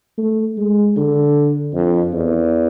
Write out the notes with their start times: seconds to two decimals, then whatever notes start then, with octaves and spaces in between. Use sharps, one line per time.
0.18 A3
0.58 G#3
0.97 D3
1.74 F2
2.14 E2